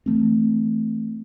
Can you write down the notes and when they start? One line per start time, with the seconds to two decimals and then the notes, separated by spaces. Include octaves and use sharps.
0.06 E3 A3 C4